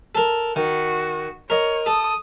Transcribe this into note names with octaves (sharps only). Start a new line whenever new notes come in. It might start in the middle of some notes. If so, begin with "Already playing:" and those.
A4 A#4
D#3 F#4
A#4 C#5 D#5
A4 D#6